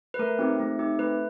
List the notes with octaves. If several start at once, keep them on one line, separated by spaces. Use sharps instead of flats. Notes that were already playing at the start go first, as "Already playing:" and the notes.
B4
A3 A#4
C4 D#4 G4
A3
C4 D#4 G4
A3 B4